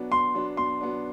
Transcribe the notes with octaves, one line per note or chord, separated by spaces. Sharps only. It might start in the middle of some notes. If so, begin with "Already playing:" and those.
Already playing: B2 F#3 B3 D4
B2 C6
F#3 B3 D4
B2 C6
F#3 B3 D4